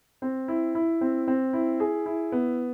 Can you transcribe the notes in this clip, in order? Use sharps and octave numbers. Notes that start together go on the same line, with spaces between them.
C4
E4
E4
C4
C4
E4
G#4
E4
B3